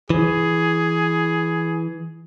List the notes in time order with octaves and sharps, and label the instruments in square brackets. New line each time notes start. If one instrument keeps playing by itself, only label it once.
[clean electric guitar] E3 [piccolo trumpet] G#4